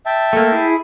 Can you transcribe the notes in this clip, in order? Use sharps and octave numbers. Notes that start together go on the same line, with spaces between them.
E5 G5 A5
A3 A#3
E4 G#4